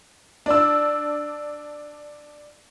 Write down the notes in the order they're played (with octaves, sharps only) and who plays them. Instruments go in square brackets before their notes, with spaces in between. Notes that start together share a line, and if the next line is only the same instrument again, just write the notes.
[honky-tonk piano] D4 E6